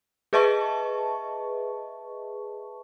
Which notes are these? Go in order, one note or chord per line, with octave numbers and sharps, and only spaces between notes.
G#4 B4 D#5 E5 A5 C#6